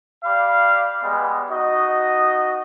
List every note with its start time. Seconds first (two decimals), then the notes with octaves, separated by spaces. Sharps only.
0.24 G4 D5 F5 B5
1.02 G3 G#3 B3
1.50 D#4 F#4 D#5